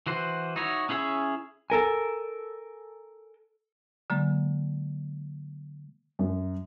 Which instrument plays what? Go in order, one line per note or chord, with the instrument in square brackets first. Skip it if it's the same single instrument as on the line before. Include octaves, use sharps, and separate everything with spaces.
[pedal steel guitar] E3 F#4 C5
D#4 E4 F#4 C#5
C#4 E4 G#4 C#5 E6
[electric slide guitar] A4 A#4 G#5
[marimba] D3 F#3 G#3 A#3
[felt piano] F#2